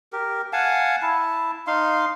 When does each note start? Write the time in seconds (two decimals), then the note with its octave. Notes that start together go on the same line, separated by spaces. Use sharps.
0.13 G4 A#4
0.53 F5 F#5 G#5 A5
1.02 E4 A5
1.67 D#4 F5 C6